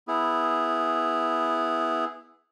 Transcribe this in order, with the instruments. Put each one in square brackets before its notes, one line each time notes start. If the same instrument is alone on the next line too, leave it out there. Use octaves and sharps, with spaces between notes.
[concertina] B3 E4 G#4